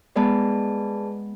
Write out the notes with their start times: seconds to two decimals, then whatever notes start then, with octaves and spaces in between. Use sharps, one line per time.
0.16 G#3 B3 G#4 B4 D5 A5